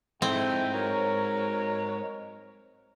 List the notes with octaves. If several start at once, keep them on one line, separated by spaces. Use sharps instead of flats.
G#3 A3 C4 D#4 E4 G5
F#3 F#4 A#4 C#5